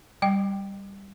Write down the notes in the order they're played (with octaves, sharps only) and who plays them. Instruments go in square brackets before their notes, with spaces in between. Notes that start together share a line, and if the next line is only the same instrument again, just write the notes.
[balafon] G3 G5